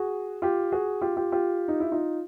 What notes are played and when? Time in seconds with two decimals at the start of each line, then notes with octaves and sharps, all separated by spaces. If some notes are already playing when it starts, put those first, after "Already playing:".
Already playing: F#4 G#4
0.42 F4 G4
0.72 F#4 G#4
1.01 F4 G4
1.17 F4 G4
1.32 F4 G4
1.68 D#4
1.80 E4
1.91 D#4 F4